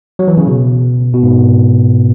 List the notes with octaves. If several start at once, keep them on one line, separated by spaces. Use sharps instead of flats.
F#3
E3
C#3
B2
B2
G#2